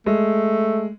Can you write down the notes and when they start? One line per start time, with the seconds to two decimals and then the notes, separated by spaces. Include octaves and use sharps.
0.06 G#3 A3